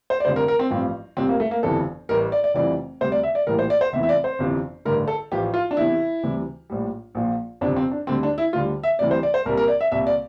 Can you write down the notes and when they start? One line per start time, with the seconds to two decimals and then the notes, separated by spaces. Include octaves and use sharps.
0.10 C5
0.20 D5
0.25 F1 F2 D3 G3 C5
0.36 A#4
0.48 A#4
0.59 C4
0.70 A1 G2 F3 C4
1.17 F1 F2 C3 G3 C4
1.29 A#3
1.40 A3
1.51 A#3
1.63 G1 F2 E3 G3 A4
2.09 A1 A2 G3 A#4
2.32 D5
2.44 D5
2.54 F1 F2 E3 G3 D5
3.01 D2 C3 G3 C5
3.12 D5
3.23 E5
3.35 D5
3.47 A#1 A2 E3 G3 A#4
3.59 C5
3.70 D5
3.81 C5
3.93 F1 E2 E3 E5
4.03 E5
4.09 D5
4.24 C5
4.39 G1 F2 C3 E3
4.85 A1 G2 D3 A#4
5.08 A4
5.32 A1 A2 F3 G4
5.54 F4
5.71 D4
5.77 E2 C3 E3 E4
6.23 D2 C3 E3 G3
6.70 A#1 A2 G3
7.15 A#1 A#2 F3
7.61 G1 F2 C3 F3 D4
7.76 C4
7.91 D4
8.07 D2 D3 G3 C4
8.23 D4
8.38 E4
8.53 D2 D3 G3 F4
8.83 E5
8.99 D2 C3 E3 G3 D5
9.11 C5
9.23 D5
9.34 C5
9.45 C2 A#2 G3 A#4
9.57 A#4
9.68 D5
9.81 E5
9.92 C2 A#2 G3 E5
10.07 D5